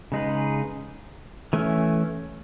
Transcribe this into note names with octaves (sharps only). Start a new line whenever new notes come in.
C#3 G#3 D#4 G#4 B4
E3 A3 C#4